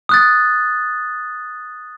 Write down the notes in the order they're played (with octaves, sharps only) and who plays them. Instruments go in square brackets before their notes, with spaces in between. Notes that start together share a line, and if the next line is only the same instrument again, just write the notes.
[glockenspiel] D#6 F#6 A6